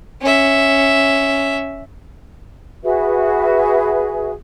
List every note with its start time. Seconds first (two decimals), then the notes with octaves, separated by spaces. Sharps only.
0.21 C#4 E5
2.83 F#4 G#4 B4 E5